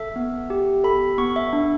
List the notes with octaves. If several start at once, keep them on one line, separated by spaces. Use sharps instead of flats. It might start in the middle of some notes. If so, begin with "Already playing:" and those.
Already playing: A4 E5
B3
G4
A4 B5
B3 C#6
E5
D4